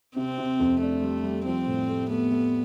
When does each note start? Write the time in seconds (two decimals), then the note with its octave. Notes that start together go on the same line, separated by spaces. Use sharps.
0.16 C3 C4
0.38 C3
0.60 F2
0.80 A3 D4
1.03 G3
1.23 G3
1.45 F3 C4
1.67 A2
1.89 A3
2.10 A3 B3
2.31 A3